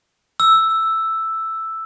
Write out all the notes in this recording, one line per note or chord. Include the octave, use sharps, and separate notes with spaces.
E6